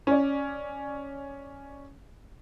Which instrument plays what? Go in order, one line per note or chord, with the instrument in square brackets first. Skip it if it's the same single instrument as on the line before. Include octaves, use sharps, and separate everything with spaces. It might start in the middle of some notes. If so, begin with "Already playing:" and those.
[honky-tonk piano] C#4 D5